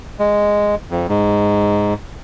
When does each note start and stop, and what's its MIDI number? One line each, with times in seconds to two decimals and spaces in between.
0.19 0.75 56
0.91 1.07 41
1.09 1.94 44